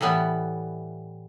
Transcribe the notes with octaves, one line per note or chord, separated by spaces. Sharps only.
A2 E3 G3 B3